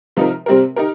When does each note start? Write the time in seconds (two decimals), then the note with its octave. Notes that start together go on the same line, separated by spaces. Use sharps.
0.16 C3 F3 D#4 A#4
0.46 C3 G3 C4 G4 A#4
0.76 D#4 G4 A#4